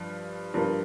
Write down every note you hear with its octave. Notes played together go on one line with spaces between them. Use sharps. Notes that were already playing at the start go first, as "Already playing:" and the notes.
Already playing: G2 F3
G2 F3 A#3